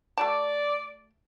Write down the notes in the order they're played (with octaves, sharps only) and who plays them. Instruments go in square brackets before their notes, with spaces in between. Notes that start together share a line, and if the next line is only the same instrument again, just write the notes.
[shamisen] A3 F#4 A5 [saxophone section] D5